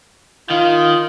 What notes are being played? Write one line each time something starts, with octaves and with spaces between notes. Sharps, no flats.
D#3 F4 F5